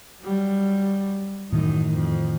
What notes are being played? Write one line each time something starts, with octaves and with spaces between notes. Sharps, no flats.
F#3 G3
F#2 A2 D#3 E3 D#4
F2